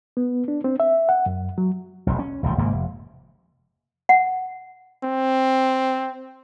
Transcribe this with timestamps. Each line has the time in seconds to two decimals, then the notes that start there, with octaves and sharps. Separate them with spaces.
0.17 B3
0.48 D4
0.64 C4
0.80 E5
1.09 F#5
1.26 F#2
1.58 F#3
2.07 F1 B1
2.19 C#4
2.43 D#1 C#2 A2 F3
2.58 G#1 G#2 C#3 A#3
2.72 F1
4.09 F#5
5.04 C4